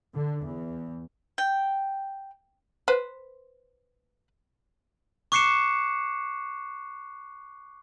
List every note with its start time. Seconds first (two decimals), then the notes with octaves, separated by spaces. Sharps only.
0.15 D3
0.46 E2
1.38 G5
2.88 B4 C5
5.32 C#6 D6 F#6 C7 C#7 E7